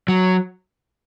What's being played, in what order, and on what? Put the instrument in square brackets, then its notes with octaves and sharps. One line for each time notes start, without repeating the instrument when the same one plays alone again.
[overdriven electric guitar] F#3